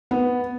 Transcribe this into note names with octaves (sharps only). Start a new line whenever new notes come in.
B3